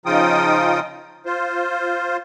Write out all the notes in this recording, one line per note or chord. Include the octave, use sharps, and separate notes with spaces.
C#3 F3 D#4 F4 G5 D#6
F4 C5